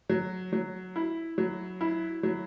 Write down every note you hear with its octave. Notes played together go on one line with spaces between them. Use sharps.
F#3
F#3
E4
F#3
E4
F#3